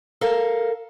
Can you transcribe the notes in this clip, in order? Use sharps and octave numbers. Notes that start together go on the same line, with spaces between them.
A4 A#4 F5